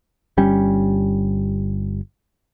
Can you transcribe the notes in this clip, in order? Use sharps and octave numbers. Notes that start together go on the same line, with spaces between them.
G1 G3 C#4